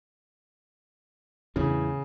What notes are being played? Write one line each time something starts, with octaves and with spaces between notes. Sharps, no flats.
E2 A2 C#3 E3